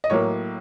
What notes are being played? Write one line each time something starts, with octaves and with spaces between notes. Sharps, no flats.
D#5
A2 F#3 A#3 C#5